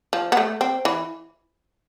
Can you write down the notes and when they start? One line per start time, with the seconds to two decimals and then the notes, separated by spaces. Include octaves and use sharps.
0.13 F3
0.32 B3
0.37 A3
0.61 C4
0.85 E3